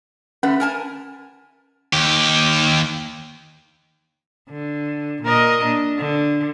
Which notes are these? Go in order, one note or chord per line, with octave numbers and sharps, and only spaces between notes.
D3 A3 C#4 B4
A#4 G#5 A5
D#2 G4
D3
A#2 A#4 D#5
D4
D3